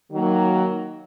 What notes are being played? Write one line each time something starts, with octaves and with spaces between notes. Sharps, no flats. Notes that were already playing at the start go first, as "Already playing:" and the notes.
D#3 F#3 A#3